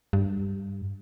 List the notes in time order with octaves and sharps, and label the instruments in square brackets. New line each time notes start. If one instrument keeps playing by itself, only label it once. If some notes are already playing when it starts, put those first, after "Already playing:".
[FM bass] G2